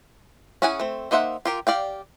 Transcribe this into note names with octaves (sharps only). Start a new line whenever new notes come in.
C#4 E4 G#4 F#5 G#5
A3 C4
A#3 D#4 C5 E5 F#5
F4 G4 A#4
G4 D5 F5 G5